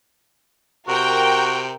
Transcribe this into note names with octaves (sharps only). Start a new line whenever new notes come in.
C3 F#4 A#4 G5